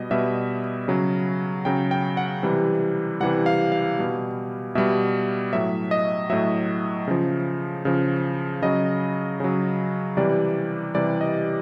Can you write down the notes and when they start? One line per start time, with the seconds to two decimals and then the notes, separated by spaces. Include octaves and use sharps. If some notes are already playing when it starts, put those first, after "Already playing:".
Already playing: B2 G3 D#5
0.11 B2 G3 E5
0.88 C#3 F#3
1.65 C#3 F#3 G5
1.91 G5
2.17 F#5
2.43 C3 E3 G3
3.20 C3 E3 G3 F#5
3.46 F5
3.72 F5
3.98 B2 G3
4.75 B2 G3 E5
5.53 A2 F#3 E5
5.91 D#5
6.30 A2 F#3 E5
7.08 C#3 F3
7.85 C#3 F3
8.62 C#3 F#3 D#5
9.40 C#3 F#3
10.17 C3 E3 G3 D5
10.95 C3 E3 G3 D5
11.21 D#5